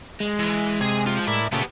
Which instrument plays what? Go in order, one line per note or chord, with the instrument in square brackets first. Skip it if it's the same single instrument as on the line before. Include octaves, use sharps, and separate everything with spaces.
[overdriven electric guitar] G#3
[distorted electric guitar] E3
[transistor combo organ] C3 [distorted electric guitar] G#4 G#5
[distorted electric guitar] F4 C5
[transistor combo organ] A2 A#4 D5 [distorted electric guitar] E4 E5
[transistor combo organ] A#2 C#3 A3 [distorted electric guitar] B3 G4